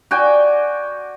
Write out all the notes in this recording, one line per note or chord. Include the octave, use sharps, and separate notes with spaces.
F#4 D5 G5 G#5